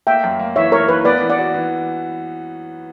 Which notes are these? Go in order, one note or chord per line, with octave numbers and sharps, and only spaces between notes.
A#3 E5 G5
F#2
A#3
E3 C#5 E5
A#3 A#4 C#5
E3 B4
B3 B4 D5
E3
D5 F#5
F#4
E3